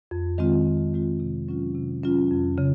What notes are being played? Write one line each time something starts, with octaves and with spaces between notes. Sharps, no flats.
F2
D#3 G#3 C4 F4
F2
D#3 G#3 C4 F4
C3
F#3 C#4 F4
C3
F#3 C#4 F4
F2
C#3